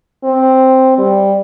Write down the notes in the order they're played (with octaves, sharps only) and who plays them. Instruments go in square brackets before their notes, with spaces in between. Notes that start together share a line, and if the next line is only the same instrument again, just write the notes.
[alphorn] C4
G3